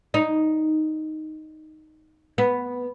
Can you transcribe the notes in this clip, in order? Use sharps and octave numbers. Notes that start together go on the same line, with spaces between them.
D#4
B3